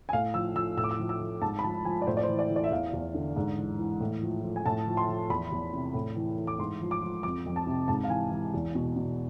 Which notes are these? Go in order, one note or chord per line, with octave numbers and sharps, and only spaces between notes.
G#5
A2 F5
F3 E6
F3 E6
A2 E6
D6
E6
F3
E6
F3
G#2 A5
B5
F3 A5
F3 G#5
D5
A2 C5
D5
C5
E3
D5
E3
D5
E5
E2 F5
E2
D3
G#2
E3
E3
A2
F3
F3
G#5
A2 A5
F3
C6
F3
E2 B5
E2
C3
A2
E3
E3
D6
G#2 C6
F3
D6
F3
F2 D6
F2
A5
C3
G#2 A5
F5
E3 G#5
E3
E2
B2
B2